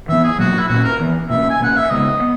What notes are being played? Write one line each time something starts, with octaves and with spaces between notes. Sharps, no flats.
E3 B3 E5
G#4
B2 F#3 A#3 F#4
E4
A#2 A#3 C#4 F#4
A#4
E3 B3
B2 A#3 C#4 E5
G#5
B2 A#3 C#4 F#5
E5
C#3 G#3 B3 D#5
B3